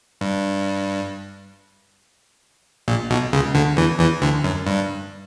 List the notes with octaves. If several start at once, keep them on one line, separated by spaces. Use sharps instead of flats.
G2
A#1 A#2
B1 B2
C#2 C#3
D2 D3
E2 E3
E2 E3
D2 D3
F#2
G2